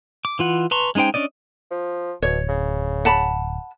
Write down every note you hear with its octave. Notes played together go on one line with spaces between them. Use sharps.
D6
E3 F4 F#5
B4 A5 A#5 C6 C#6
G#3 C#4 D#4 C5 G5
C#4 D4 D5 D#5
F3
D1 B2 C#5
C#3
F#5 A5 B5